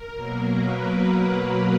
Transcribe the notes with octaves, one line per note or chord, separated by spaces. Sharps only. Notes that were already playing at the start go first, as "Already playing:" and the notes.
Already playing: A#4
B2 F#3 A#3
B4